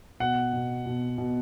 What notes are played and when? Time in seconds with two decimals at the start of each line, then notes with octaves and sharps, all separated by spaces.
0.20 B2 F#5
0.53 B2
0.86 B2
1.18 B2